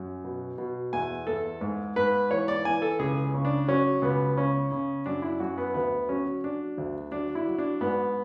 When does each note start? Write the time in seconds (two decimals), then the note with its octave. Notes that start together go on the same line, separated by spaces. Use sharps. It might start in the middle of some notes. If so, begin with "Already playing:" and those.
Already playing: F#2
0.24 B2
0.58 B2
0.93 E2 G#5
1.27 E2 A4
1.61 G#2
1.96 G#2 B4
2.31 E3 C#5
2.48 D5
2.65 E3 G#5
2.82 A4
2.99 C#2 G#4
3.34 C#3
3.45 D4
3.68 F#3 C#4
4.02 C#2 B3
4.37 C#3 C#4
4.72 C#3
5.06 F#2 D4
5.22 E4
5.40 F#2 F#4
5.58 B3
5.74 D2 B3
6.09 F#3 C#4
6.44 F#3 D4
6.78 D2
7.12 F#3 D4
7.35 E4
7.47 F#3
7.58 D4
7.81 G#2 B3